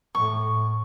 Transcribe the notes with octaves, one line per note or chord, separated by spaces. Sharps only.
A2 C#6